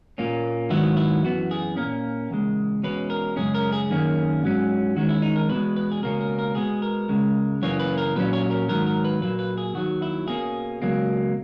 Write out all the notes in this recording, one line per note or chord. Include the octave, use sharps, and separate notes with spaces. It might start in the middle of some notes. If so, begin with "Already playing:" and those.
A#2 A#3 C#4
G#2 D#3 F#3 B3 E4
E4
F#2 E3 B3 F#4
G#4
A#2 A#3 C#4 A#4
E2 C#3 G#3
E2 B2 G#3 C#4 B4
A#4
F#2 C#3 G#3 C#4 G#4
A#4
G#4
F#2 D#3 A#3 C#4
G#2 F#3 C#4
E2 D#3 G#3 C#4 F#4
E4
D#4
A#4
E2 B2 G#3 B4
B4
G#4
C#2 B2 A#3 C#4 A#4
A#4
A#4
B2 G#3 B3 G#4
A#4
C#2 C#3 G#3
F#2 C#3 E3 A#3 C#4 C#5
B4
A#4
A#2 F#3 C#4 B4
C#5
A#4
G#2 D#3 F#3 A#4
A#4
B4
A#2 F#3 A#3 B4
B4
G#4
D#2 D#3 F#3 F#4
E4
B2 A#3 C#4 G#4
C#2 B2 F#3 A#3